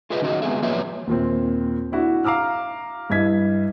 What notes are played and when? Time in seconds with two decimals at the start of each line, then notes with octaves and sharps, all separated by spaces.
0.10 F4 G#4 A4 B4 D#5 E5
0.22 D#3 C#4 D#4 F#4 A4 D#5
0.42 G#3 B3 C4 G#4 E5
0.62 F3 F#3 A#3 B4 C#5 E5
1.07 D#2 A#2 C4
1.92 D4 E4 F#4
2.24 F5 A#5 D6 E6 F6
3.10 G2 E4 D#5 G#6 B6